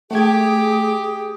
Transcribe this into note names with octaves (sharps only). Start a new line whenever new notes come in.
A3 G4 G#4 G#6